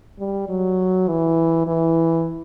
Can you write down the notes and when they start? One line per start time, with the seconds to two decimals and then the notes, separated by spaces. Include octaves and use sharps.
0.19 G3
0.49 F#3
1.08 E3
1.67 E3